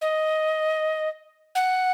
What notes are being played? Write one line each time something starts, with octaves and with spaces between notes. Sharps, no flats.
D#5
F#5